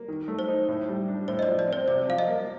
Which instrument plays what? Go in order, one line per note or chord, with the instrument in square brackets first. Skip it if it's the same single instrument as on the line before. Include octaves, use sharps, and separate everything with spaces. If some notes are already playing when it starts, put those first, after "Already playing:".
Already playing: [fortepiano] A#3
D#3
A3
[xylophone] C5
[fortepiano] D#4
A2
G3
D4
[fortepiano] A2 [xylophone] C5
[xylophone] D#5
D5
[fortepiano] F3
[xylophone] D5
[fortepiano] C4 [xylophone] C5
[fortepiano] C3 [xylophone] D5
[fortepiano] F3 [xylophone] F5
[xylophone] D#5
[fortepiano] A#3